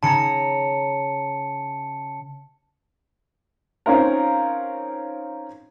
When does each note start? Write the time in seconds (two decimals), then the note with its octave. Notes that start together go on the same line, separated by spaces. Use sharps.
0.03 C#3 A5 A#5 C#7
3.86 C4 C#4 D#4 F4 A#4